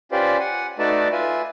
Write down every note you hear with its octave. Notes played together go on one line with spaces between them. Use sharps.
C#4 F4 G4 B4 C5 D5
F#5 G#5
A3 D#4 F#4 B4 D5 A5
F4 B4 E5 G#5